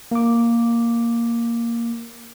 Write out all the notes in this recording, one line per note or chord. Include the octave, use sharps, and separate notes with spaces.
A#3 D6